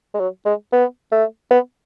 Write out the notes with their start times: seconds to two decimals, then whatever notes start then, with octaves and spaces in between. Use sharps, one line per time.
0.14 G#3
0.20 F#3
0.45 G#3
0.72 B3
1.12 A3
1.51 B3